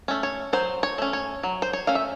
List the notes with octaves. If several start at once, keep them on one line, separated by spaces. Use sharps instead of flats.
A3 C#4
C#5
F#3 C5
C#5
A3 C#4
C#5
F#3
C5
C#5
A3 C#4 F5
E5